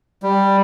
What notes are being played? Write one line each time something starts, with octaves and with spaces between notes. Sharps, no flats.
G3